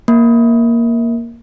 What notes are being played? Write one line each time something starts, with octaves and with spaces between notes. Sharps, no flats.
A#3